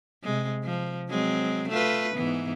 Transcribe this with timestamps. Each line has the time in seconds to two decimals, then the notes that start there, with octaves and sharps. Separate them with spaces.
0.24 C3 G#3
0.64 F3
1.09 F#3 G#3 C4
1.69 A3 F4 B4
2.15 G#2 E3 B3